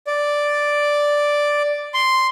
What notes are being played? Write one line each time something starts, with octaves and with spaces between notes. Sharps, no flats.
D5
C6